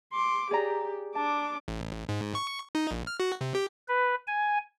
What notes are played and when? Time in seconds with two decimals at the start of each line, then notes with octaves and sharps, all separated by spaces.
0.13 C6 D6
0.51 G4 G#4 D5 A#5
1.15 D4 A5 D6
1.68 A1
2.09 G#2
2.35 C#6
2.75 D#4
2.91 A#1
3.07 F6
3.20 F#4
3.41 C3
3.55 G4
3.88 B4
4.27 G#5